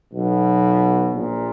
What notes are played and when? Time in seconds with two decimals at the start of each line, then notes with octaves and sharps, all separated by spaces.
0.13 B1 B2
1.13 A#1 A#2